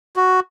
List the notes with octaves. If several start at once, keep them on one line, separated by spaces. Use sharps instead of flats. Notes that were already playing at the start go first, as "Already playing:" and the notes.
F#4